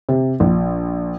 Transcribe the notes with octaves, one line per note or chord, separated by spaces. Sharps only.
C3
A#1